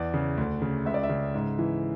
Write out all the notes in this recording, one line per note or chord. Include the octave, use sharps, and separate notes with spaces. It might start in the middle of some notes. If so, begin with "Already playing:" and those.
Already playing: E2 D5
C#3
D2
C#3
C#2 E5
D5
E5
C#3
G#2
E3